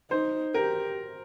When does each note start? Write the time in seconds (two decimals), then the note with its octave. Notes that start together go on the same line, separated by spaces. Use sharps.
0.11 D#4 C5
0.54 G4 A#4